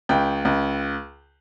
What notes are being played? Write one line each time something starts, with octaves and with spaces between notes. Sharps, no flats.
C#2 G5
C#2